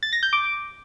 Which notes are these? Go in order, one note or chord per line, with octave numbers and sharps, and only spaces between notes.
A6
A#6
G6
D6